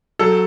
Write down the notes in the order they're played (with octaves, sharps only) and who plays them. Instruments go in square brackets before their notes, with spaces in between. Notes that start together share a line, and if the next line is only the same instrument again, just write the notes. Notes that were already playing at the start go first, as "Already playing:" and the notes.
[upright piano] F#3 A4